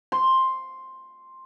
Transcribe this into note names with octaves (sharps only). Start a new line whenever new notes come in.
C6